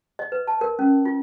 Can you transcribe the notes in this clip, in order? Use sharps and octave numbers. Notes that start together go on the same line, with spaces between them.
D#5
B4
A5
A#4
C#4
F4